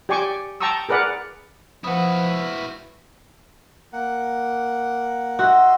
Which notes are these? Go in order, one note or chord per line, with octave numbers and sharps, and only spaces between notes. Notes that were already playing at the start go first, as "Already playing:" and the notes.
G4 D5 G5 G#5 C#6 D6
G5 A5 A#5 C#6 D#6 E6
G#4 A#4 B4 D5 F#5
F3 E4 F#4 B4 F#5 D#6
A#3 F#5
F#4 D#5 E5 C6